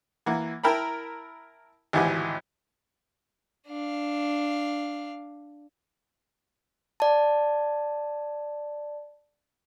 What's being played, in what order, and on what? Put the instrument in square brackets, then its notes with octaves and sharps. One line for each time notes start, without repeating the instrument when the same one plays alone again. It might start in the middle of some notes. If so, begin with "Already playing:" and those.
[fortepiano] E3 A#3 F#5
E4 A#4 G5 A5 B5
G#1 D2 E3 G4 F#5 G#5
[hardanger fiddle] D4 F5
[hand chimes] D5 A5